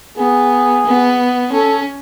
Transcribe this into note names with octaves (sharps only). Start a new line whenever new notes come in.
B3 G#4
B3
C#4 A4